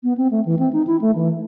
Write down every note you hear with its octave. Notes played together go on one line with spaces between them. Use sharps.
B3
C4
A3
E3
C4
D#4
E4
A3
E3